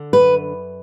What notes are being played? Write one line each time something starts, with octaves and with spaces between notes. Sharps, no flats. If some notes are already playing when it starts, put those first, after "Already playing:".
Already playing: D3
F#2 B4